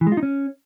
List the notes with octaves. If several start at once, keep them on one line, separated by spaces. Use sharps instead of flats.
E3
G#3
F4
D#4
C#4